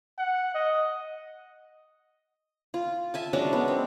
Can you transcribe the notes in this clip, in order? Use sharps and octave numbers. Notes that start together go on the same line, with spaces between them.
F#5
D#5
F4
E5 G#5 A5
F#3 G#3 C#4 D4
B3
C4